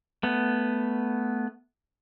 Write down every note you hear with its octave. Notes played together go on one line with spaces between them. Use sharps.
A3 B3